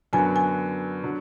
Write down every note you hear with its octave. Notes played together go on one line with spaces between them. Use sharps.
F#2 D3 F#3 B3 G#5
G#5
D3 F#3